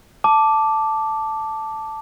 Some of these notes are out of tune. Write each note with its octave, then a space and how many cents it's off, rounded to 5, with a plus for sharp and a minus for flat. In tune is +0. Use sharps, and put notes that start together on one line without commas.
A5 +0 D6 +0